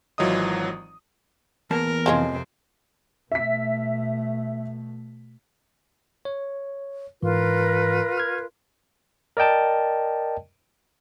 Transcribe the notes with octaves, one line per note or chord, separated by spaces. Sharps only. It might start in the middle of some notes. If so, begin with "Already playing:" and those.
G#1 E3 F#3 F4 D#5 D#6
E2 A#3 A#4 A5
F2 C3 F3 G#3 C4 C#4
B2 A3 E5 B6
C#5
G#2 E3 F4 A#4 B4
F6 G#6
A#4 D5 D#5 G5 A5